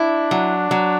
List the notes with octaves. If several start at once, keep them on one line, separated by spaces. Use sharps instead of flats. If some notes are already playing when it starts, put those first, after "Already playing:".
Already playing: D4 E4
F#3
F#3